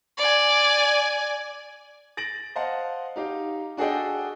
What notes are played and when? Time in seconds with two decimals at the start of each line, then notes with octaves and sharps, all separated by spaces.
0.17 D5 G#5
2.17 A6 A#6 D7 F#7
2.56 C5 D#5 F5 F#5 A5
3.16 D#4 G4 F5
3.77 D4 F#4 G#4 A4 D#5 G5